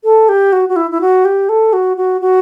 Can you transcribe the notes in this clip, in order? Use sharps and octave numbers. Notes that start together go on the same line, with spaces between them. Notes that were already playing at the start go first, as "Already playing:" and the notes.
A4
G4
F#4
F#4
E4
E4
F#4
G4
A4
F#4
F#4
F#4